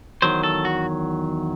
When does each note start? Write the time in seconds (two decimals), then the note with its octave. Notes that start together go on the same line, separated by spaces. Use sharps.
0.22 E2 D#3 F#3 C5
0.43 A4
0.65 F#4